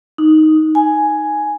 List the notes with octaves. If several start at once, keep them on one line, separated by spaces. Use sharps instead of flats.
D#4
G#5